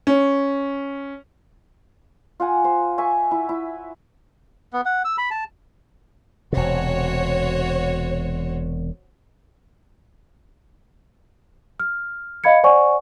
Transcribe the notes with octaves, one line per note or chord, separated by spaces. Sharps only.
C#4
F4 F#5 G#5
C5
E5 G#5 C#6
E4
E4
B3
F#5
E6
B5
A5
E1 C3 F#4 C5 C#5
F6
D#5 F5 B5 G#6 C#7
C5 D5 F#5 G#5 C#6